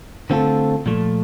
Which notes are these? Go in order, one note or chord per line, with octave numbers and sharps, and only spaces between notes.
D3 A3 C4 F4 A4
A#2 F3 A3